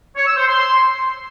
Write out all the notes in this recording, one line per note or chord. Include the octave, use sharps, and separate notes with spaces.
C#5
E6
C5
C6